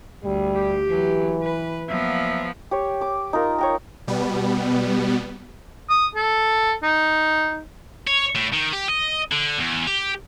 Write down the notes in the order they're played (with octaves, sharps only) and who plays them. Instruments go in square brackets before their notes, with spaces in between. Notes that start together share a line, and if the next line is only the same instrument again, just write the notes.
[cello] D2 [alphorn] G3
[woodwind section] G4
[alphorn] E3 [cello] F#3
[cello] B4
[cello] F3 B3 [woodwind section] F#3 A#3 E5
[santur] G4 C#5
D6
D#4 F4 A#4
C#5 G5 A#5
[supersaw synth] B2 G3 B3
[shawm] D#6
A4
D#4
[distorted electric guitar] C#5
A2
D#3
G4
D#5
D3
E2
G4